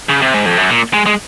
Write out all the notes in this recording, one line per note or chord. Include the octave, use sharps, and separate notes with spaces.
C#3
C3
G#2
F2
F#2
A#2
G#3
G#3